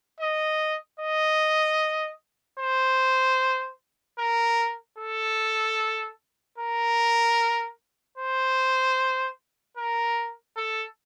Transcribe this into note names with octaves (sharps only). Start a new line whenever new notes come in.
D#5
D#5
C5
A#4
A4
A#4
C5
A#4
A4